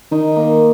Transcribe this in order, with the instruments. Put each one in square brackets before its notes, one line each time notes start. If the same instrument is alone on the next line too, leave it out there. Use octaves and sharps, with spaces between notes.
[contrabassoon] D#3 [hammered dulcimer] D#4
[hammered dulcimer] A#3